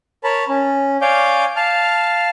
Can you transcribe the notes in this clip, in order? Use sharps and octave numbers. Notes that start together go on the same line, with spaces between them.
A#4 C#5 A5 B5
C#4
C#5 D5 F5 G#5 D6 G6
F5 A5 F6